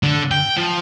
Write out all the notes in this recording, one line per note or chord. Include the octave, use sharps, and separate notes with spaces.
D3
G5
F3